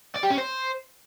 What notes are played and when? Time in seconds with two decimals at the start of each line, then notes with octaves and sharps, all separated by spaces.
0.16 D5
0.23 G4
0.30 C#4
0.38 C5